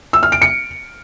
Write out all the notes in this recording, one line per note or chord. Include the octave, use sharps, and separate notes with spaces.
E6
F6
D7
C#7